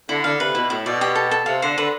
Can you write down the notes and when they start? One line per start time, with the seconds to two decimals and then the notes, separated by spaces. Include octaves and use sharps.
0.09 D3 E4
0.24 D3 F5
0.40 C3 B4
0.55 B2 E4
0.70 A2 E4
0.86 B2 D5
1.01 G4
1.15 A4
1.31 A4
1.46 C3 F5
1.62 D3 C5
1.77 D3 B4